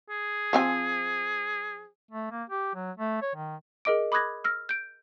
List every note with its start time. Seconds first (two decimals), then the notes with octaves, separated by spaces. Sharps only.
0.10 G#4
0.53 F3 C4 G#5
2.11 A3
2.32 A#3
2.50 G4
2.75 F#3
2.97 A3
3.22 C#5
3.35 D#3
3.85 G#4 A#4 D#5 D6 D7
4.12 B5 D6 D#6 F#6 G#6 A#6
4.44 E6 F6 A#6
4.69 G6 D7